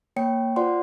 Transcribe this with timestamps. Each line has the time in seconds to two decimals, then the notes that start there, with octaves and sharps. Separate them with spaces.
0.16 A#3 C#5 G5 C#7
0.56 F4 C5 D5 F#5 C6